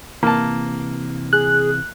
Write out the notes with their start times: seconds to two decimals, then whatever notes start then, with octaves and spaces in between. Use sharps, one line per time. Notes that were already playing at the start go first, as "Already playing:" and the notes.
0.23 C3 E3 A#3 A5
1.33 G#4 F#6